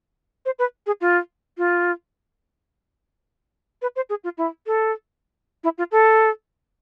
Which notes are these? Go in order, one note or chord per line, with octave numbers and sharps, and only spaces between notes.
C5
B4
G#4
F4
F4
B4
C5
G#4
F4
E4
A4
E4
F4
A4